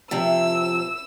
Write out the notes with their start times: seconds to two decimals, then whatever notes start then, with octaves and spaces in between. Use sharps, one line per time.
0.11 C3 F3 C4 E4 E6